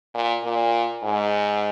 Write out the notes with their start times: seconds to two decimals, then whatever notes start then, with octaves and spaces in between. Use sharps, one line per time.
0.14 A#2
0.44 A#2
1.03 G#2